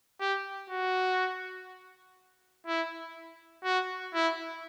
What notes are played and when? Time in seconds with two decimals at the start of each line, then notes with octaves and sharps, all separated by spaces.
0.20 G4
0.70 F#4
2.67 E4
3.64 F#4
4.14 E4